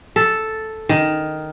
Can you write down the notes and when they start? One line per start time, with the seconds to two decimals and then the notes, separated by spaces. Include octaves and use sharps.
0.16 A4
0.89 D#3